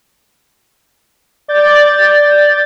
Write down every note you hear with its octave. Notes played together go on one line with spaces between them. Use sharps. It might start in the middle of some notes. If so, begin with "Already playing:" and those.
D5 G6 A6